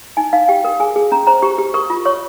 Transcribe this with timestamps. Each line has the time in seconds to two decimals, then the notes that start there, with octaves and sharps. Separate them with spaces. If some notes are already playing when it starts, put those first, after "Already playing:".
0.17 D#4 G#5
0.33 D#4 F5
0.48 G4 G5
0.64 A#4
0.80 G#4 G#5
0.96 G#4
1.12 C#4 A#5
1.27 C5 A#5
1.42 G4 C#6
1.58 G4
1.74 A#4 C#6
1.90 F4
2.05 C#5 C#6